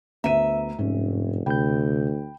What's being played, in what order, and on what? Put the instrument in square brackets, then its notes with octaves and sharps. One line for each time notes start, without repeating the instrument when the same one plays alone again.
[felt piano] D2 B3 D#7 [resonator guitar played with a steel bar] E5 [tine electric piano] A#5
[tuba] F1 [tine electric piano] G#2 [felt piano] C#4
[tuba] D2 [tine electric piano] C3 G6 [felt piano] G5 B5